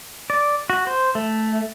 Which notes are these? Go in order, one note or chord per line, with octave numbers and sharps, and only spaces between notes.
D5
F#4
C5
A3